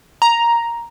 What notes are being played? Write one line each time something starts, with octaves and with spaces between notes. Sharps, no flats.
A#5